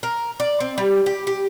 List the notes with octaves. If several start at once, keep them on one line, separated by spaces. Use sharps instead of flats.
A#4
D5
C4
G3
G4
G4